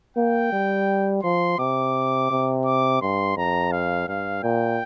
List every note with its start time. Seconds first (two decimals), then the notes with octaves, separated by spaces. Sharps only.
0.16 A#3 G5
0.52 G3
1.23 F3 C6
1.58 C3 D6
2.31 C3
2.65 D6
3.02 G2 C6
3.37 F2 A#5
3.72 F5
4.08 G2 F5
4.43 A#2 G5